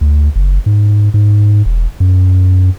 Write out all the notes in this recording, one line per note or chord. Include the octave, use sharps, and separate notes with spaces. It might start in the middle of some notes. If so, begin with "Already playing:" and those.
D2
F#1
G#2
G#2
E1
F#2